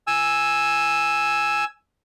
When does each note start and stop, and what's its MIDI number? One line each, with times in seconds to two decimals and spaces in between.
0.07 1.64 80
0.07 1.64 88